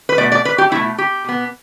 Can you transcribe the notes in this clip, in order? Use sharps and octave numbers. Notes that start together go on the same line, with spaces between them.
B4
B2 A3 D5
D5
B4
G4
B2 A3 E4
G4
B2 B3